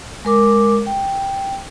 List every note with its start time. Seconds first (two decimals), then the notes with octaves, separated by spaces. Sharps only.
0.25 G#3 A#4 D6
0.86 G5